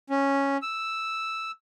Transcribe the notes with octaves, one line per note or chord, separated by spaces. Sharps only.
C#4
E6